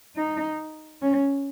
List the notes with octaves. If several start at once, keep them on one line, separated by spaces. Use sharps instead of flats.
D#4
C#4